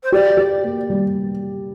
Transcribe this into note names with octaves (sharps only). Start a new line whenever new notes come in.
C5
G4 D5
G4
A#3
G3